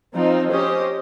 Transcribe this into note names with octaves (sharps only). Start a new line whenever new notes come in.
F3 C4 D#4
C#4 G4 C5 D#5